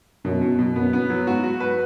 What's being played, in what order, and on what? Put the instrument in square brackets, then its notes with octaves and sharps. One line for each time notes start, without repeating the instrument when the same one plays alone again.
[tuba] F#2 [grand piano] B2
[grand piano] B2
B2
[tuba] F#2 [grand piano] B3
[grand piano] B3
F#3
[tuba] G#2 [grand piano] F#4
[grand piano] F#4
B4